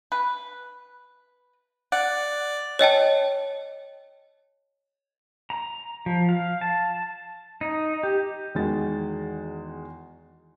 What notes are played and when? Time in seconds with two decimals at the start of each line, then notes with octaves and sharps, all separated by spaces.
0.12 B4
1.92 D5 F#5
2.79 C#5 D#5 G5 A5
5.50 A#5
6.06 F3
6.29 F5
6.61 A5
7.61 D#4
8.03 G4
8.55 E2 D#3 G#3 F#4 A6